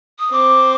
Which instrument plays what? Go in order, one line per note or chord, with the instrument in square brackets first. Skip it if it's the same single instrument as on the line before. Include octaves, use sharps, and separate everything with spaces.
[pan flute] D#6
[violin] C4 [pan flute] D6